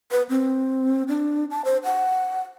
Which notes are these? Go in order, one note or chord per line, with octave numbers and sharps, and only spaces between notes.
B4
C4
D4
A5
C5
F#5